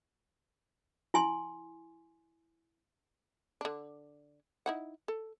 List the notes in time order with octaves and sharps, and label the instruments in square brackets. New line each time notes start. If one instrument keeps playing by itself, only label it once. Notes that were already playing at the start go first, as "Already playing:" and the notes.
[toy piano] E4 G#5 C6
[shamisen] D3 D4
D#4 E4 F#5
A4